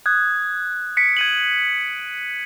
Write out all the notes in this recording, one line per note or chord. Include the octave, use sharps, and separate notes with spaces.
D#6 F#6 G#6
B6 C#7 D7
G#6 D#7 F#7